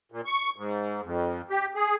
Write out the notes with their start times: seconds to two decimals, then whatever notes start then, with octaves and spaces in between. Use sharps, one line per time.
0.12 A#2
0.26 C#6
0.56 G#2
1.03 F2
1.50 G4
1.76 G#4